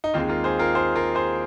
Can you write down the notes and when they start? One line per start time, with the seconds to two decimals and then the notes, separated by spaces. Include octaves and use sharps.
0.04 D#4
0.14 D#2 D#3 G#3 C4 F4
0.29 F4 A#4
0.44 G#4 C5
0.59 F4 A#4
0.75 G#4 C5
0.96 F4 A#4
1.15 G#4 C5